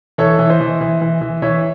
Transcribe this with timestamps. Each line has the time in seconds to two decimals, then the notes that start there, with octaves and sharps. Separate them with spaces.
0.18 E3 A4 C#5
0.39 E3
0.49 C5 D#5
0.60 E3
0.81 E3
1.01 E3
1.21 E3
1.42 E3 C#5 E5